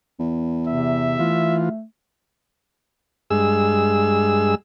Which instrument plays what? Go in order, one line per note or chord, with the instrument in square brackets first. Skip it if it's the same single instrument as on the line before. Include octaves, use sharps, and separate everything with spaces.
[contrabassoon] E2
[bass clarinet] C3 [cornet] E5
[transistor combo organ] E3 F4 [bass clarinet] A3
[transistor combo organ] G2 G#3 G#4 E6